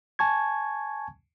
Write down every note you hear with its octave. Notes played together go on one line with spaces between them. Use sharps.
G#5 A5 C#6 G#6